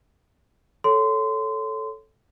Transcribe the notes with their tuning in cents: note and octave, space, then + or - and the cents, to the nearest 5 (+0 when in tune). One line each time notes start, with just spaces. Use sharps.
A4 -5 C#5 +0 C6 -25